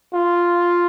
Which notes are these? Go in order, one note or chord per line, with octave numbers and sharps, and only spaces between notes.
F4